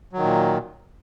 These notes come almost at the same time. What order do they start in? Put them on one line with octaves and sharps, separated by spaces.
F#3 D#3 A#2